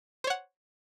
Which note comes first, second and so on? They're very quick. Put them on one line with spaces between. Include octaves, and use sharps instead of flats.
C5 C#5 F#5